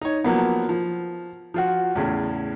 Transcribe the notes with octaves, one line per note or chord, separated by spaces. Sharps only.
D#4 C#5
F3 F#3 A#3 B3
F3
F3 F4 F#4
E2 A2 C#3